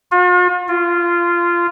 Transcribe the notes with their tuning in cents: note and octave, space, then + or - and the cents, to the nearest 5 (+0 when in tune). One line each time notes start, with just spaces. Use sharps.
F4 +45
F4 -15